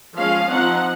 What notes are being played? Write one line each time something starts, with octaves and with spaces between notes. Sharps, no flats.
F3 G#3 C#4 F5
F3 C4 D#4 F#5